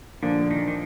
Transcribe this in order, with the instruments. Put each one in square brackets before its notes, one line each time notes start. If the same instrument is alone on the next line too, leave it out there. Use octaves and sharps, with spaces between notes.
[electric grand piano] A#2 F3 A#3 D4 [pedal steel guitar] D3
[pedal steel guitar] D#3
D#3